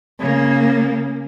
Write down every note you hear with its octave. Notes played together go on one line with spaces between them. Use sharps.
C#3 A#3